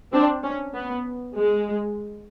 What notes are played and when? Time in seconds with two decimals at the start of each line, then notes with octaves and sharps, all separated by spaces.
0.12 C4 D4
0.43 C#4
0.74 B3
1.36 G#3